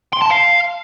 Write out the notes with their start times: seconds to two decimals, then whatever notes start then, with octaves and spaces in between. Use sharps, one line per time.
0.13 C6
0.22 A5
0.30 F5